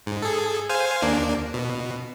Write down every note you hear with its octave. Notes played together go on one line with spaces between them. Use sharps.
G#2
G#4 A4
C5 F5 G#5
D#2 A#3 D4
B2